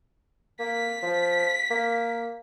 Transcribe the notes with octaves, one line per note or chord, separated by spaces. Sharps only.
A#3 B6
F3
A#3